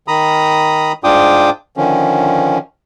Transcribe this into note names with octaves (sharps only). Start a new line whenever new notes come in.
D#3 A#5 B5 D#6
G#2 D4 F4 G5 D6 D#6
D3 D#3 F3 C#4